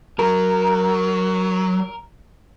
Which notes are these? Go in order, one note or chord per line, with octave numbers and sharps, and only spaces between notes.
F#3 A#4